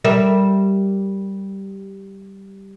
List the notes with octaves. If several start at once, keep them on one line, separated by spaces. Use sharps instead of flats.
G3 A#4 E5